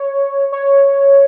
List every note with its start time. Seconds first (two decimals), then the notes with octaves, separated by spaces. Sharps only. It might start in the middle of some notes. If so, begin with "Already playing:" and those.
Already playing: C#5
0.52 C#5